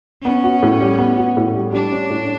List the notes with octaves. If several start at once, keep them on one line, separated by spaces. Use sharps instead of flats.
B3 C#4
F#4
A2
G3
B3
F#4
A2
G3
G3 D4
C#4
A2